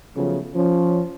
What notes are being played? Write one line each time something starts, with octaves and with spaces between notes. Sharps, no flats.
C#3 F3 F#3 A3 B3
F3 C#4